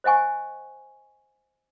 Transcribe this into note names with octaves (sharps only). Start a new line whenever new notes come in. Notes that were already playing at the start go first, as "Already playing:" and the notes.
C5 D#5 F#5 G#5 C#6